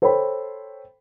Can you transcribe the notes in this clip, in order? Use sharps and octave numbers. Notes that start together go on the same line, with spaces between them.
A4 C5 C#5 G5 B5